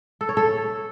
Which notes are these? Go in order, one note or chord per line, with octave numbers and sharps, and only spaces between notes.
A4
C#5
A4